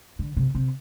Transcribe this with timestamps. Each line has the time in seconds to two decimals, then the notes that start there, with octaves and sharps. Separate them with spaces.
0.19 D3
0.37 C3
0.55 C3